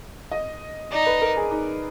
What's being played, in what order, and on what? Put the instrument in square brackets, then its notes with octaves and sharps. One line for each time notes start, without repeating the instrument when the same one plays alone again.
[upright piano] D#5
[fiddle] D#4 [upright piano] D5
[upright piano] B4
A#4
G#4
D#4